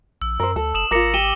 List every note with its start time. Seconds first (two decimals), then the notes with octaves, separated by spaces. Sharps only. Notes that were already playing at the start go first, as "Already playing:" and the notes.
0.22 A#1 E6
0.40 F#2 A#4 C5
0.56 D2 A4
0.74 F#1 D#6 E7 F#7
0.91 G#1 F4 A#4 D6 A#6 C#7
1.14 G4 D#7 E7 G7